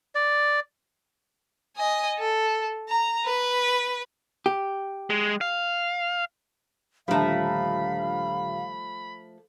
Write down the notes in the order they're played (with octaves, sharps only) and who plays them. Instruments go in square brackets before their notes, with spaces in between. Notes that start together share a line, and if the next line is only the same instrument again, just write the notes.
[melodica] D5
[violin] D#5 G#5
A4
A#5
B4
[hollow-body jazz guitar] G4
[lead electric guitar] G#3
F5
[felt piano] D#1 D3 A#5 [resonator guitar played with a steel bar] F3 A3 [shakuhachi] F5 [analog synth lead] B5